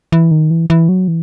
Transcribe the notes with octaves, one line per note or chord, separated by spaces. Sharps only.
E3
D#3
E3
E3
F#3
E3